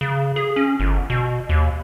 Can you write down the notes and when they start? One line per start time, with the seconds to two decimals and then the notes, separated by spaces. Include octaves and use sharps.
0.01 C#3
0.36 G#4
0.56 C#4
0.80 G1
1.10 B2
1.49 D#2